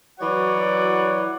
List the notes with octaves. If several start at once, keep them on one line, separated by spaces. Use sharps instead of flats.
E3 F#3 F#4 C#5 D5 F#5